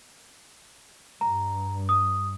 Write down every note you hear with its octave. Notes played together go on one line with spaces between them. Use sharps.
G2 A#5
D#6